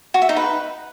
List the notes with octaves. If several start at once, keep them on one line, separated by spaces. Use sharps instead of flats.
F#4
E5
D#4
B4